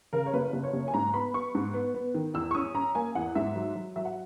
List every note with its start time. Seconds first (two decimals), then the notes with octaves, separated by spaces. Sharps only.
0.13 C#3 A#4
0.26 C#5
0.34 F#1 B4
0.53 F#1
0.64 C#5
0.73 F#1
0.88 G#5
0.94 G#2 A#5
1.14 B3 B5
1.34 B3 C#6
1.55 G#2
1.74 B3
1.94 B3
2.14 D#3
2.34 E2 E6
2.51 C#6
2.55 C#4 D#6
2.75 C#4 A#5
2.95 A#3 G#5
3.15 E2 F#5
3.35 G#2 E5
3.56 F#3
3.76 F#3
3.96 F#3 E5
4.05 F#5